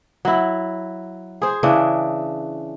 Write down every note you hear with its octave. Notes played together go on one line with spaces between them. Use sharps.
F#3 E4
G#4 C5
C#3 E3 D4